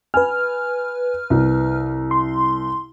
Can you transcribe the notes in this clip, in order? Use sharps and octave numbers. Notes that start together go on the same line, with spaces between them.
B4 G#5 F6
C2
C6